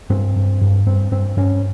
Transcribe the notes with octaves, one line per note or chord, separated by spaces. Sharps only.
G2 C4
G2
G2
G2 C4
G2 C4
G2 C#4